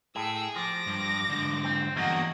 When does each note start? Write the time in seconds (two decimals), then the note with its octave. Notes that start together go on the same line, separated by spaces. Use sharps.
0.16 A2 G#4 G5 E6
0.56 F3 D6 A#6
0.87 G2
1.29 G#2 D3
1.65 C4
1.96 E2 G2 F#3 A#3 D#5 F#5